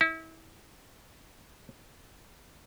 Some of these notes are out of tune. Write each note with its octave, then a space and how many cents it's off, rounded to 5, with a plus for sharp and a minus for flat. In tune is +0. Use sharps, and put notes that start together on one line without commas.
E4 -30